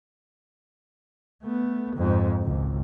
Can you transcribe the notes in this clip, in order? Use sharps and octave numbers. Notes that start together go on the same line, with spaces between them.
A3 B3
F2 G#2
G#1 C#2